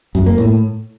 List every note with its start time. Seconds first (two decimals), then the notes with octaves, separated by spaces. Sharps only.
0.15 F#2
0.26 A#3
0.38 A2